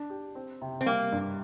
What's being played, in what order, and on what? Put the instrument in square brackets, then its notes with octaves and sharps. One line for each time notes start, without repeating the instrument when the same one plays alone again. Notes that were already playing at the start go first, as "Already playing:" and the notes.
Already playing: [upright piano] D4
G4
C4
C3
[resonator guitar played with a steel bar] C4
[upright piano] G3 [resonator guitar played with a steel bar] A#3
[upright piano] G2